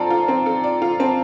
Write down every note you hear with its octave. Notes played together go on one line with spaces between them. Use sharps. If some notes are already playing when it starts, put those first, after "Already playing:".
Already playing: C4 F4 A4 D5 A5 A#5
F4
C4
A4
D5
F4
C4 A5